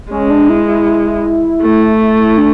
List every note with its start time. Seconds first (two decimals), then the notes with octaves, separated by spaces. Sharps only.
0.11 G#3 C#4
0.30 D4
0.49 E4
0.68 E4
1.62 A3
2.38 D4